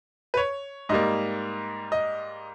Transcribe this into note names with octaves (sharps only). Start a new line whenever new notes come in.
B4
C#5
G#2 G3 A#3 D#5
D#5